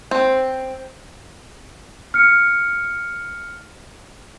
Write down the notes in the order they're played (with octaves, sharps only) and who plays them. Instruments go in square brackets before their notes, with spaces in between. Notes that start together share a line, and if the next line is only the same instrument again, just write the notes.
[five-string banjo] C4
[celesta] F6 C#7